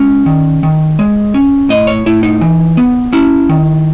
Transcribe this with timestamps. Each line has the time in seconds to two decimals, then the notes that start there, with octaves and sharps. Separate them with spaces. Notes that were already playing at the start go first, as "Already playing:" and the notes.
Already playing: G#3 C#4
0.26 D#3
0.63 D#3
0.99 G#3
1.34 C#4
1.69 A2 D#5
1.87 C#5
2.06 A2 E4
2.23 D#4
2.41 E3
2.77 B3
3.13 C#4 E4
3.49 D#3